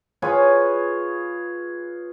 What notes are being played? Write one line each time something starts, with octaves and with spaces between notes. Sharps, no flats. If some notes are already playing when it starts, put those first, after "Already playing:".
F4 G#4 B4 C#5